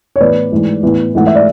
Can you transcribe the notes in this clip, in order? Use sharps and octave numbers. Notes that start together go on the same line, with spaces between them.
C#5
A2 E3 B3 B4 D5
G#2 E3 A3
A2 E3 B3
G#2 E3 A3 F#5
E5
D5